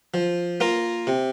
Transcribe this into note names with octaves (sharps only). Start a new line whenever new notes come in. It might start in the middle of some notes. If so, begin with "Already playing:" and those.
F3
A#3 F4 A#4
C3